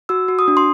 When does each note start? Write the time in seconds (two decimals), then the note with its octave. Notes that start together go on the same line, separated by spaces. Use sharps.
0.09 F#4 E6
0.28 F#4
0.39 D#6
0.48 D4
0.57 C6